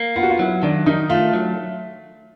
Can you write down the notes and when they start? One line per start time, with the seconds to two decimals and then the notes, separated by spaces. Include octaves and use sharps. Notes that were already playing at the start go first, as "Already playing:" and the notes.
Already playing: A#3
0.16 B3 F4
0.23 F#4
0.30 F4
0.39 F#3 E4
0.63 D#3 D4
0.86 D#3 D#4
1.10 A3 F4
1.33 F#3